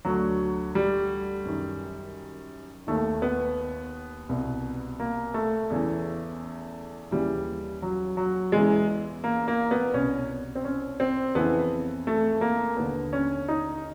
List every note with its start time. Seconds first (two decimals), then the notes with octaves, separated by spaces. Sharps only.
0.05 D2 D3 F#3
0.75 G3
1.45 F#2 D#3
2.87 D#2 D#3 A3
3.22 B3
4.29 C2 B2
5.00 A#3
5.34 A3
5.70 E2 C#3 E3
7.11 D#2 C#3 E3 G3
7.82 F#3
8.17 F#3
8.52 E2 C#3 E3 G#3
9.24 A#3
9.48 A#3
9.71 B3
9.94 C2 B2 C#4
10.55 C4
10.65 C#4
11.00 C4
11.35 F2 C#3 E3 B3
12.07 A3
12.41 A#3
12.77 D#2 D3 B3
13.13 C#4
13.48 D#4